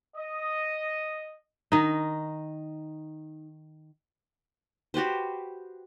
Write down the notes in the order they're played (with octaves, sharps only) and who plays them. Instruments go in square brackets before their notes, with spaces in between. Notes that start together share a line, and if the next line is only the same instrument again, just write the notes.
[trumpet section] D#5
[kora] D#3 D#4
[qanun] F#4 G4 B4 C5